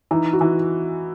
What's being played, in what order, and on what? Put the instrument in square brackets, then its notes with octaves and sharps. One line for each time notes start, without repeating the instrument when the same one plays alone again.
[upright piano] E3 [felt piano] D#4
[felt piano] F#4
[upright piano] E3